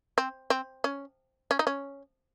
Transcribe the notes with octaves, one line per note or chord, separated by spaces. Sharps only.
C4
C4
C#4
C#4
D#4
C#4